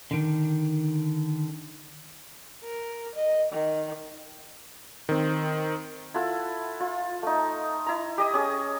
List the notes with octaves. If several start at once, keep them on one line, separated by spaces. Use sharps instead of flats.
D3 D#3
A#4
D#5
D#3
D#3 C4
E4 F4 A4 F#5
F4
A3 D#4
E4 A#5
G4 D#5 D#6
C#4 G#4